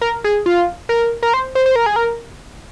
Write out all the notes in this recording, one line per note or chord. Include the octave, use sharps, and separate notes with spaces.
A#4
G#4
F4
A#4
A#4
C5
C5
C5
A#4
G#4
A#4